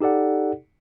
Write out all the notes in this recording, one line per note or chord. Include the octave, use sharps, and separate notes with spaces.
D#4 G4 A4 D5 F#5